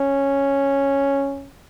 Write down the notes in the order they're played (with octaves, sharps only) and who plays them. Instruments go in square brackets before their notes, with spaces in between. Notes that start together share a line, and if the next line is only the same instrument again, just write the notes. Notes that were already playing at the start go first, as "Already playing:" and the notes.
Already playing: [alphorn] C#4